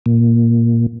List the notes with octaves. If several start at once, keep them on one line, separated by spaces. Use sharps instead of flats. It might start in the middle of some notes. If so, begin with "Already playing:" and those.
A#2